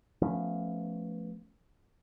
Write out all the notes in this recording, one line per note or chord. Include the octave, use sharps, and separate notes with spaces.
F3 A3 B3 C#4